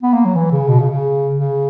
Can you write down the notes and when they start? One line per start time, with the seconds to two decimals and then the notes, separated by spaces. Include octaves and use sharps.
0.03 B3
0.13 A#3
0.25 F#3
0.35 E3
0.52 C#3
0.68 B2
0.80 C#3
0.90 C#3
1.34 C#3